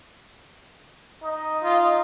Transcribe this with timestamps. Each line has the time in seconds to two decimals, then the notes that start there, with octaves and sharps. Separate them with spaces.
1.23 D#4 D#5
1.63 F4